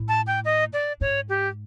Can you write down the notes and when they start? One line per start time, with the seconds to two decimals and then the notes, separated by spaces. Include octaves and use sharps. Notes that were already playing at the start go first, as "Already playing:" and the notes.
Already playing: A2
0.08 A5
0.27 G5
0.45 D#5
0.73 D5
1.01 G#2 C#5
1.29 G4